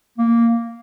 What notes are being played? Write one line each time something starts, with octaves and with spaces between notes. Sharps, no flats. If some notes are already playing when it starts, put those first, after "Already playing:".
A#3